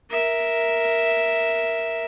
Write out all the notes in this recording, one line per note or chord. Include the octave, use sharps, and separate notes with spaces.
A#4 E5